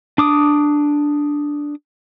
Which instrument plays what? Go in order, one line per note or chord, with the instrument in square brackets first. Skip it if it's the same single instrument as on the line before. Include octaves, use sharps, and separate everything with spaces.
[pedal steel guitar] D4 D6 D#6